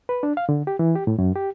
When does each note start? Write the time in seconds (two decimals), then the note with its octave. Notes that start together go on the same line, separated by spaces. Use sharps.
0.09 B4
0.23 D4
0.37 F5
0.49 D3
0.67 G4
0.79 E3
0.96 G4
1.07 A2
1.18 F#2
1.36 G4